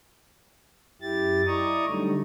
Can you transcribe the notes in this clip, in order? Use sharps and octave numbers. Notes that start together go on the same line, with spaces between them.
F#2 E4 G4 A6
E4 D5 D#5 A#5 C#6 D#6
D3 F#3 G3 A3 D#4